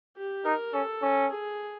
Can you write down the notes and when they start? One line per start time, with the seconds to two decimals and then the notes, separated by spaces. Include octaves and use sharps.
0.17 G4
0.45 D#4 A#4
0.73 C#4 A4
1.02 C#4
1.30 G#4